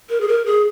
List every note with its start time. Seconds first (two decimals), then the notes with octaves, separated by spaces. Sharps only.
0.10 A#4
0.21 G#4
0.28 A#4
0.46 G#4